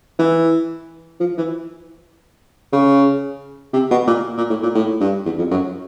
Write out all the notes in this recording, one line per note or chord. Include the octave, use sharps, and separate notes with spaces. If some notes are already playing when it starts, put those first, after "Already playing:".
E3
F3
E3
C#3
C3
B2
A#2
A#2
A2
A#2
A2
G2
E2
F2
F#2